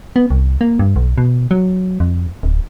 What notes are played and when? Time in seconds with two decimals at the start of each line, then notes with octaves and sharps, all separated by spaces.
0.16 B3
0.30 C2
0.61 A#3
0.79 G2
0.96 B1
1.18 B2
1.51 F#3
2.00 F2
2.43 D1